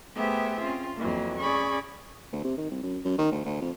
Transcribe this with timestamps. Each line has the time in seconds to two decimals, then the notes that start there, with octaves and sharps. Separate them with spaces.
0.16 A3 B3 G4 G#4 C5 E5
0.62 C4 C#4 F4
0.96 F2 E3 F#3 A#3
1.40 C#4 G#4 D5 B5 C#6
2.32 D2
2.44 C3
2.57 D#3
2.70 C2
2.83 F#2
3.04 F#2
3.18 D#3
3.31 D2
3.45 D2
3.61 F2